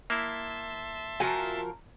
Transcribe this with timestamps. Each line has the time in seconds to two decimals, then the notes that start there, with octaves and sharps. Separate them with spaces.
0.10 A#3 E4 E5 A5 C6
1.20 F3 F#4 A#4 G#5